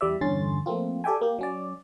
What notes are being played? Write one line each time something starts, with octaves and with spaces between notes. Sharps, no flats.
E2 G3 D5 E5
E2 G2 D3 C#4 C6 A6
F3 A3 A#3 C4 F4
G4 A4 D5 E5 G5 G#5
A#3 G4
F#3 C#4 D5